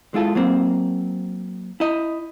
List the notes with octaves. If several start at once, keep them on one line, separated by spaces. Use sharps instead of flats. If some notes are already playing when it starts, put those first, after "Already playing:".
G#3 E4 F4 A4
F#3 A#3 C4
E4 D#5